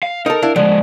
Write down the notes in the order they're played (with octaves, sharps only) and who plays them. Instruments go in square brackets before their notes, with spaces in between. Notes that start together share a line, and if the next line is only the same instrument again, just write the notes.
[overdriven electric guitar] F5
[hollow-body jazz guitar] D#4 A4 [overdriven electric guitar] A#4
[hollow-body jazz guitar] D4 E4 F5
[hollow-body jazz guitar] D3 [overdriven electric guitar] F3 G#3